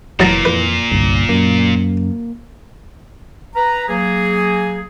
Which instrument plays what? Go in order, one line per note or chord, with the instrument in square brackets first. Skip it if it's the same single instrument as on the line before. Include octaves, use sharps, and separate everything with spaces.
[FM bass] F1 [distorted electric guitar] A#2 [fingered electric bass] E3 [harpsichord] F#3 A5 A#5
[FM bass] F2 [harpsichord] B4
[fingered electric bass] G1 G2 [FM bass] C2
[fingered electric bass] F#2 [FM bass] A#3
[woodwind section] B4 A#5
F#3 A#3 G#4